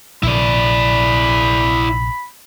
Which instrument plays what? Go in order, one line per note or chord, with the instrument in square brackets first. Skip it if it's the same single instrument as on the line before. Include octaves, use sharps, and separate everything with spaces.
[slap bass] A#1 C3 [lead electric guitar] E4 D5 [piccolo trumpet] B5